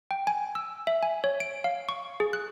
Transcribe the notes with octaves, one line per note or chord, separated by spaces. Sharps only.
G5
G#5
E6
E5
G#5
C#5
D7
F5
C#6
G#4
F#6